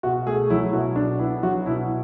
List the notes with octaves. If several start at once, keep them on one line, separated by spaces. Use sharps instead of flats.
B2 F#4
A3 G#4
F#3 E4
B2 F#4
D4
B3 E4
F#3 F#4
B2 E4